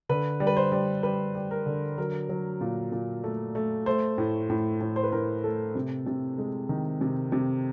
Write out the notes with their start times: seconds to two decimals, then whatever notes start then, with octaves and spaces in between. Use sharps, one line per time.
0.09 D3 B4
0.40 G3
0.47 B4
0.57 C5
0.72 G3
1.03 G3 B4
1.35 G3
1.51 A#4
1.66 D3
1.98 F#3 A#4
2.29 F#3
2.61 A#2
2.92 A#2
3.24 A3
3.55 A3
3.86 A3 C5
4.18 A2
4.50 A2
4.81 A2
4.96 C5
5.03 B4
5.12 A2 A#4
5.44 A3 A4
5.75 C3
6.06 C3
6.38 G#3
6.69 D#3
7.01 C3
7.32 C3